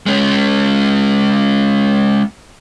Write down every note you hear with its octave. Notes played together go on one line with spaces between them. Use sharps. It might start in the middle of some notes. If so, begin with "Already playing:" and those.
G#3 C#4